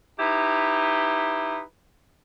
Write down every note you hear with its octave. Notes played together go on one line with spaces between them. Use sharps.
D#4 E4 G4 B4